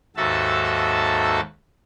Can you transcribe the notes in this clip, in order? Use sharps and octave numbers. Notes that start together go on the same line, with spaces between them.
D#2 G#2 F#4 A4 E5 A5